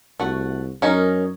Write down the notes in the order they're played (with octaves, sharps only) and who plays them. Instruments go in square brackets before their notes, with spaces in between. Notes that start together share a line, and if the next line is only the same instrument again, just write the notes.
[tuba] C2 [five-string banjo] A3 F#4
[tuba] F#2 [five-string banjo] C#4 D#4 A#4